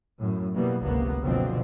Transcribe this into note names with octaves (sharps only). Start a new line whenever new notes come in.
F#2 A2
B2 E3 G3 A#3 B3
G1 C#2 C3 A#3 B3
F#1 B2 D3 F3 F#3 C4